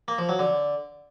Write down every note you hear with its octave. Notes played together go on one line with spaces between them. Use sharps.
A#3
F3
F#3
D3